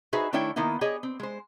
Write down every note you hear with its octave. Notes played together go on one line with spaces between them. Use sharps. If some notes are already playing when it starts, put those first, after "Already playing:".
D#4 F#4 G#4 B4 C5 E5
D#3 A3 D4 E4 C#5 G5
D#3 A#3 B3 D#4 E4
G4 G#4 C#5 D#5
C4
G#3 C5